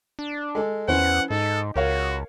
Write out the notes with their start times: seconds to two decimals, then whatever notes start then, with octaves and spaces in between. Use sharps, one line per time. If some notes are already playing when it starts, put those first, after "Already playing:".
0.19 D4
0.55 G#3 A4
0.88 E2 E3 C#4 C5 F#5
1.30 G#2 D#4 A4
1.76 C#2 F#4 A#4 C#5 F5